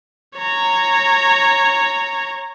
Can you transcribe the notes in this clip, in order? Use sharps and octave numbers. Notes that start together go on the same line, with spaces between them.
C#5 A#5